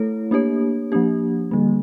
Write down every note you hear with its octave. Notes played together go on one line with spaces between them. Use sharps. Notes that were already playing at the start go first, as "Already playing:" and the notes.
Already playing: A3 E4 A4 C#5
A#3 D4 G4 C#5
F3 A#3 D4 G4
D3 G3 A#3